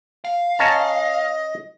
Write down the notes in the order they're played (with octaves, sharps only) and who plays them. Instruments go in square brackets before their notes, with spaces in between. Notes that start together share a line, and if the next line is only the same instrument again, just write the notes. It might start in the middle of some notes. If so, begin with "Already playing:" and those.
[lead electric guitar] F5
[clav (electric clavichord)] C#4 A5 A#5 [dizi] D#5